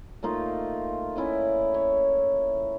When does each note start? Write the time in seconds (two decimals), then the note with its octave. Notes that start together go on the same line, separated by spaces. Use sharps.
0.23 A3 A#3 D#4 F4
1.16 C#4 E4 D5 D#5
1.74 C#5